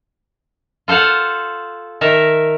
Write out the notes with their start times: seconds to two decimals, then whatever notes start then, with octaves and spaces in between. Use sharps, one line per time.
0.88 F4 A4 C5 F5 F#5
2.01 D#3 A#4 E5 A5